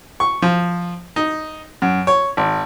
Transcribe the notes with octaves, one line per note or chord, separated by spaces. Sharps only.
C#6
F3
D#4
F#2
C#5
G#1